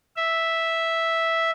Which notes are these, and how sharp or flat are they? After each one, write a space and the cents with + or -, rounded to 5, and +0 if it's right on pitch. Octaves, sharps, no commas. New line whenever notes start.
E5 -5